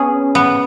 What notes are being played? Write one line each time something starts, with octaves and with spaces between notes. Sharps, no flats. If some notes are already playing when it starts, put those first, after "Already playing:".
Already playing: B3 C#4 G#4
B3